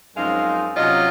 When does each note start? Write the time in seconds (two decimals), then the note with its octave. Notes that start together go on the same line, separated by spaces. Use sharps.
0.16 F#2 F3 G#3 C4 D#4 F5
0.75 C3 F#3 C#4 F4 D#5